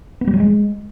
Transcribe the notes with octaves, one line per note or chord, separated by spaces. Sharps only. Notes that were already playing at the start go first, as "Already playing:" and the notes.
B3
G3
F#3
G#3